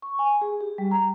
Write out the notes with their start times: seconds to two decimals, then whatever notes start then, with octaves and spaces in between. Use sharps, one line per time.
0.02 C#6
0.19 G#5
0.41 G#4
0.61 G4
0.78 G3
0.91 A#5